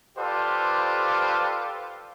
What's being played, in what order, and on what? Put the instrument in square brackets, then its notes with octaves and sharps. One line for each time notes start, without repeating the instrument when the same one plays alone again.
[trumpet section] F4 G4 A4 B4 C5 D5